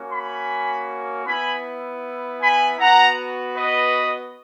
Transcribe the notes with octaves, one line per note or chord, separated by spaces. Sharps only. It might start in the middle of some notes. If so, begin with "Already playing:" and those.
Already playing: A#3 C#4 F#4
G#5 B5
B3 E4 G#5 B5
G#5 B5
B3 F#4 F#5 A#5
B4 D#5